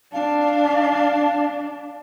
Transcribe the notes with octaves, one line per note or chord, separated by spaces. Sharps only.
D4 F5